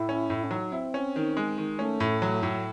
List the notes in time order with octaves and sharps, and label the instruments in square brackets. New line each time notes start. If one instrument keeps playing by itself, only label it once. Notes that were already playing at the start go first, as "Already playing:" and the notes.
Already playing: [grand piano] A2 [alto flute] E4
[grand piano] C#4
A2
[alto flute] C#4
[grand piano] F#3 [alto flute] D#4
[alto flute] C4 [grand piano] E4
[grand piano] C#4
D#3
G#3
D#3
[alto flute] A3 [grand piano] C#4
[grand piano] A2
F#3
A2